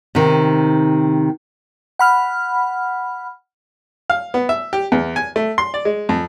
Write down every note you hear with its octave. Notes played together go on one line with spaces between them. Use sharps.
C3 D#3
F#5 B5 F6
F5
B3
E5
G4
E2
G#5
A3
C6
D5
G#3
F2